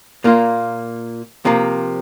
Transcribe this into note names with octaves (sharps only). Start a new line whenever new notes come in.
A#2 A#3 F4
C3 F3 A#3